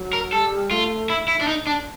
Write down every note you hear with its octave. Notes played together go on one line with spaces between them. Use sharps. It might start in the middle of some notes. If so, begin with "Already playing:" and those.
Already playing: F#3
A#4
G3 A4
A3 F4
E4
E4
D4
D#4
D4